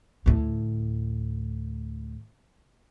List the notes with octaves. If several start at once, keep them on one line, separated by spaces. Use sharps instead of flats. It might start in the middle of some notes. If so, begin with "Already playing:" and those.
D2 A2